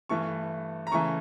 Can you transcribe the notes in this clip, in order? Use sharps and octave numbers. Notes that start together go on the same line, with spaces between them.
G2 E3 A3 C#6
A#5
C#3 E3 A3 C#6